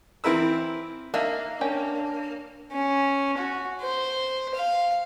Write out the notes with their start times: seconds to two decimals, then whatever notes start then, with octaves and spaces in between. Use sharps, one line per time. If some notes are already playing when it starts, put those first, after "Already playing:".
0.24 E3 C4 E4 A#4 B4 E6
1.14 A#3 D4 D#4 E5
1.61 C#4 D4 G5
2.72 C#4
3.38 F#4
3.81 C5
4.54 F5